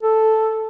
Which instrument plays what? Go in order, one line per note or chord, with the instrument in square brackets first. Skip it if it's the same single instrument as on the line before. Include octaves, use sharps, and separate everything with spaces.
[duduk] A4